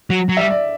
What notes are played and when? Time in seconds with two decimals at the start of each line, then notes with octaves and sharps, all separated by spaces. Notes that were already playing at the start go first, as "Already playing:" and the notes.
0.10 F#3
0.29 F#3
0.37 G3 E5
0.50 D5